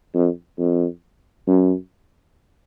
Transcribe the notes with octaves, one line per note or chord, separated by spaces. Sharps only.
F2
F2
F#2